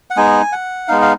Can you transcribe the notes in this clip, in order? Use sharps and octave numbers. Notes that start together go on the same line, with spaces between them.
F#5
G#3 B3 D#4 G#5
F#5
G#3 B3 D#4 F5
F5